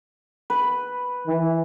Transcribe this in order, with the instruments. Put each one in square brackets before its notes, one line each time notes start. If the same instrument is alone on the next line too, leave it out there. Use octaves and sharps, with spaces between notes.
[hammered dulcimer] B4
[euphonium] E3